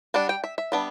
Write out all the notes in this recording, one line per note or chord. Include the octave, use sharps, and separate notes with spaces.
G3 D4 F#5
G5
E5
E5
G3 B3 D4